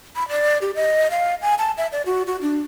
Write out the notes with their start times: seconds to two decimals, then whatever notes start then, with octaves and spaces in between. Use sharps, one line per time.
0.16 B5
0.29 D5
0.62 G4
0.75 D#5
1.11 F5
1.42 G#5
1.59 A5
1.78 E5
1.92 D5
2.06 F#4
2.27 F#4
2.42 D4